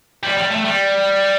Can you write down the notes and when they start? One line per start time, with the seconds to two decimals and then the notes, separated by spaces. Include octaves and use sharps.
0.23 G3
0.37 G3
0.51 A3
0.65 G3